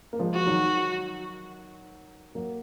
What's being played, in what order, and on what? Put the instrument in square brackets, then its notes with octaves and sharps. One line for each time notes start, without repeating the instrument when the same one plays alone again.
[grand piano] A#3
F3 G#3
[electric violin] F#4
[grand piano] D#3 F#3
F#3 A#3